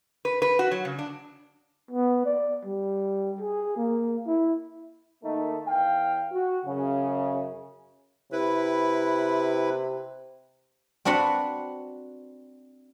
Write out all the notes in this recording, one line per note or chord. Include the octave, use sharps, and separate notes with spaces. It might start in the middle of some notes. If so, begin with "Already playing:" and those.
B4
B4
F#4
F#3
C#3
D4
B3
D5
G3
G#4
A#3
E4
D#3 A3 A#3 D#4
E2 F5 G5
F#4
F#2 C#3
C3 E4 B4
C4 D4 F#4 B4 F#5 C6